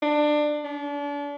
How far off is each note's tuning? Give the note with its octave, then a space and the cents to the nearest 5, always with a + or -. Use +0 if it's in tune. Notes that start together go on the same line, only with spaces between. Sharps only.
D4 +20
D4 -35